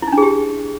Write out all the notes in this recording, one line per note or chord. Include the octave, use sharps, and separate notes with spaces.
E4
D#4
D4
G#4
G4